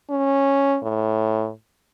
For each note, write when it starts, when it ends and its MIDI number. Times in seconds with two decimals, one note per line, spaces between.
0.10 0.78 61
0.83 1.50 45